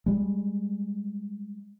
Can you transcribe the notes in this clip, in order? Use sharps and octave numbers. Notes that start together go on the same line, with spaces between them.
G3 G#3